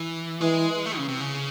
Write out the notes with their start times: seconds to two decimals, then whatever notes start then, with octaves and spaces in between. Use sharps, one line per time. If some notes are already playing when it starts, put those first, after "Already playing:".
Already playing: E3
0.41 E3 G#3
0.86 A3
0.97 C#3
1.08 C3
1.21 C#3